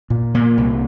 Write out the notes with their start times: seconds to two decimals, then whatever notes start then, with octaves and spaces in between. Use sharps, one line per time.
0.10 A#2
0.34 A#2 A#3
0.58 C2